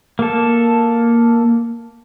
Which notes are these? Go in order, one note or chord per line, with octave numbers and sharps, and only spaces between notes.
A#3 A4